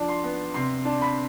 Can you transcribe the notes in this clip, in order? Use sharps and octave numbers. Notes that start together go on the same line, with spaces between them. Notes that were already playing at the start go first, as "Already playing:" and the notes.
Already playing: F3 D4
C6
B3
C3 C6
D4
B5